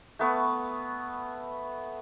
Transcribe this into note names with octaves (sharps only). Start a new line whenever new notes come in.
A3 B3 B4 C#6